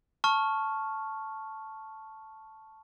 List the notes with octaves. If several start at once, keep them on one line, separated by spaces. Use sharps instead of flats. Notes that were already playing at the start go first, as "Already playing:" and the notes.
A5 C#6 F6